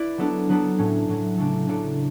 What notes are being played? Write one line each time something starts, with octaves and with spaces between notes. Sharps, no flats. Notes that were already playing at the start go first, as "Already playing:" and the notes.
Already playing: E4 B4 D5
F#3 B3 D4 A4
F#3 B3 D4 A4
A2 F#3 C#4
A2 F#3 C#4
C#3 F#3 A3 D4 A4
C#3 F#3 A3 D4 A4